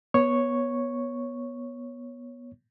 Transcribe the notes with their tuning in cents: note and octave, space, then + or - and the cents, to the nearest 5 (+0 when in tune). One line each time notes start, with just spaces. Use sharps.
B3 -20 C#5 +0 C#6 +0